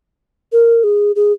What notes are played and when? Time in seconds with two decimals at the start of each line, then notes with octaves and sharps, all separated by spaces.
0.52 A#4
0.84 G#4
1.16 G#4